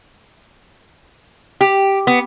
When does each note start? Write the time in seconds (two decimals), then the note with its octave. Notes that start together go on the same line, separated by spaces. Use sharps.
1.61 G4
2.07 B3